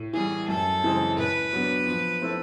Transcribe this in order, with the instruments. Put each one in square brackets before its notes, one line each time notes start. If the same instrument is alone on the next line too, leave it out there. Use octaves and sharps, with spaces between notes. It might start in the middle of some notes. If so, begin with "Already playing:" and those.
Already playing: [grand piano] A2
[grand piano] E3 G3 [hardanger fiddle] G#4
[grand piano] F#2 [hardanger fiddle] A4
[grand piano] C#3 E3 G#3 C4
[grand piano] A2 [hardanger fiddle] B4
[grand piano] F#3 B3 D4
F3
A3 C4 E4 A4